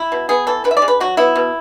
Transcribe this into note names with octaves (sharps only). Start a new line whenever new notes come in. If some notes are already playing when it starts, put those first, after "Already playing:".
Already playing: E4
B2
B3 G#4
E3 A4
D3 B4
E5
D5
G#3
B4
F#3 F#4
B3 E4
B2